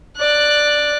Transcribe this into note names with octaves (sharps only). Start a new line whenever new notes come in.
D5 F#6